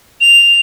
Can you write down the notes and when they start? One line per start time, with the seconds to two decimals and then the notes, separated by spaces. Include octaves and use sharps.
0.21 F7